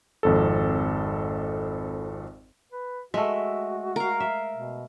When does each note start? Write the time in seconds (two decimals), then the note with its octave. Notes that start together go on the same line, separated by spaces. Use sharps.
0.23 G#1 F2 A4
2.72 B4
3.14 G#3 A3 F#4 E5
3.96 A#4 F5
4.20 E5
4.54 B2